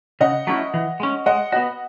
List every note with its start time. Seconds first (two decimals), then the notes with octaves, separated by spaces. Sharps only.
0.21 C#3 D#5 F#5
0.47 F#3 A3 C#4 E4
0.74 E3
1.00 G#3 C#4
1.26 G#3 D#5 F#5
1.52 B3 F#4 D#5 F#5